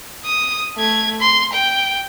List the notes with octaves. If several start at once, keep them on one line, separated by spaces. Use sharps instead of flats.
D#6
A3 G#6
C6
G5